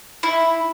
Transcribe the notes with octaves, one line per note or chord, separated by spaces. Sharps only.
E4